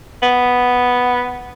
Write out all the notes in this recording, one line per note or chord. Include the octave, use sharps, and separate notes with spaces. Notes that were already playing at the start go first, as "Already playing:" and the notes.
B3